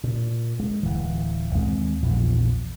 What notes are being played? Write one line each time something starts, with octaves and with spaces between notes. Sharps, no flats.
A#2
G#3
D1 E3
D#2 G#3 C4
A#1 E2 F3